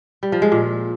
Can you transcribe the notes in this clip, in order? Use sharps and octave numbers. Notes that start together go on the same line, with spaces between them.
G3
F3
G#3
A#2